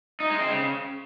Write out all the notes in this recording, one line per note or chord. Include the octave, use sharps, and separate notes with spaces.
D#4
G#3
C4
C#3